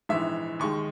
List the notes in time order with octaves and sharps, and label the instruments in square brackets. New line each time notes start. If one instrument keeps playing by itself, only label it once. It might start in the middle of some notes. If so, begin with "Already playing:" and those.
[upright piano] A#1 G#2 E3 E5
D#2 D#3 G#3 C#6